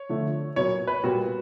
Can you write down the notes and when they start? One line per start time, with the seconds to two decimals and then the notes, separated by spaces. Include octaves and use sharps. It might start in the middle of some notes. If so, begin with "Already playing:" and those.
Already playing: C#5
0.09 D3 F3 A3
0.56 A#2 F#3 B3 C#5
0.87 B4
1.03 A#2 G3 B3 F#4